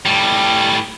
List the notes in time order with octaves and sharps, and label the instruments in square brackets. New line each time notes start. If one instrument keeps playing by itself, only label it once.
[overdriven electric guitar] A2 G3